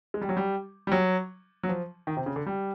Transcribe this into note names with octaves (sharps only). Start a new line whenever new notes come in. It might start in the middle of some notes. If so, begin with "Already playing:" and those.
G#3
G3
F#3
G3
G3
F#3
F#3
F3
D#3
C3
C#3
D3
G3